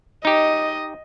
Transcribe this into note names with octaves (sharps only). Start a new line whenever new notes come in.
D#4 G4 D#5